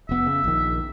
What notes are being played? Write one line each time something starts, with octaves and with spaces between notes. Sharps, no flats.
F1 B3 E5
C#3
A#1 D#3